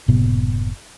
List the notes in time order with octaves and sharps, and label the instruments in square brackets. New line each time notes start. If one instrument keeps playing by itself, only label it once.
[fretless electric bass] F#1 A2 C3 B3